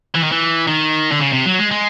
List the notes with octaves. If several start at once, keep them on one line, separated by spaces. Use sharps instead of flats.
E3
D#3
E3
D#3
D3
C#3
C3
F#3
G#3
G#3